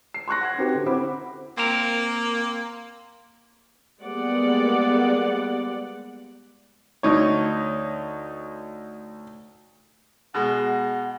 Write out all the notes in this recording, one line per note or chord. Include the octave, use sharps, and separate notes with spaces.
C7
C6 C#6 F#6 A#6
F#5 F#6 G#6
C4 D#4 F#4 G4 B4 C5
D3
C4 E4 C5 F#5 B5 D6
A#3 C4 A#4
G3 G#3 A#3 B3 D5 F#5
D2 D#4 C#5
B2 G#3 F#5